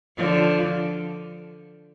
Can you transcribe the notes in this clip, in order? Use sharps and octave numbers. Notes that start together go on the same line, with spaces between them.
D3 F3